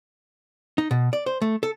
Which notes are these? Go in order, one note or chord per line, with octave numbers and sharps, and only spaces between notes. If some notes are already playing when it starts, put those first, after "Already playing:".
D#4
B2
D5
C5
A3
A4